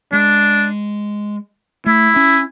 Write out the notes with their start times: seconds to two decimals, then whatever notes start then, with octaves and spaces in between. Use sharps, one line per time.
0.12 G#3 D4
1.86 A3 E4
2.16 C#4